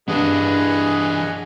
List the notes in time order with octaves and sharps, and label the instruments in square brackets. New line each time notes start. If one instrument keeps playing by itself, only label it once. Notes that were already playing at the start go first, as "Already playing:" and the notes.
[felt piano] G2 [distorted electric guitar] E3 D4 [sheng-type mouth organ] G#4 D#5 F#5